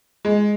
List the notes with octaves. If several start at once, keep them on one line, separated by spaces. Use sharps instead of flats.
G#3